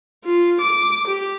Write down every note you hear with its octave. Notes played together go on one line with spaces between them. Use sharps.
F4
D6
G4